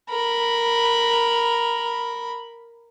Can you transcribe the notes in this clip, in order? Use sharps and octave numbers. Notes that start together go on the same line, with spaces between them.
A#4 B5